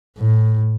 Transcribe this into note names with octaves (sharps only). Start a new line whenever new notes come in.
A2